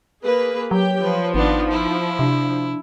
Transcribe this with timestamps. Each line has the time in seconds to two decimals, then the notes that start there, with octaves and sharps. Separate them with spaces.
0.22 A#3 G#4 B4
0.71 F#3 G4 C#5 G5
1.02 F3 B4
1.34 G#1 B3 D4 D#4
1.71 E4
2.19 C3 D4